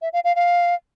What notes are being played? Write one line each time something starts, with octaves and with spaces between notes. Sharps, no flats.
E5
F5
F5
F5